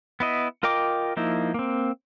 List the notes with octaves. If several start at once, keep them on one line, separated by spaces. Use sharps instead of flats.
B3 E4 D#5
F4 A#4 D#5 G5 D6
F3 A#3 D#4 E4
A#3 C4